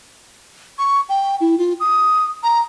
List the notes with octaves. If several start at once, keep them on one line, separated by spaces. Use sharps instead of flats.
C#6
G5
E4
F4
D#6
A#5